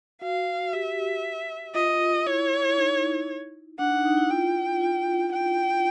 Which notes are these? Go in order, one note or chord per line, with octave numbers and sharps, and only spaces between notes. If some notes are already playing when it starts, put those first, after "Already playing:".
F#4 F5
G4 E5
F4 D#5
E4 C#5
D#4
D4 F#5
D#4
D#4
E4
F4 G5
F4
G5